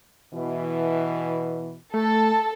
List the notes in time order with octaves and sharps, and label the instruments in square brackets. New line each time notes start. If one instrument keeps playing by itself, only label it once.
[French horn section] B2 E3
[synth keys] A3 [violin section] A4